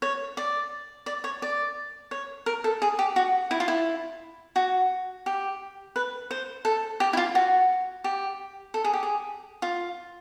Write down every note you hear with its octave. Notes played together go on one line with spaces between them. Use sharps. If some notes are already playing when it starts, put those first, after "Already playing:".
C#5
D5
D5
C#5
D5
C#5
A#4
A4
G#4
G4
F#4
E4
F4
E4
F#4
G4
B4
C5
A4
G4
E4
F4
F#4
G4
A4
G#4
G4
G#4
F4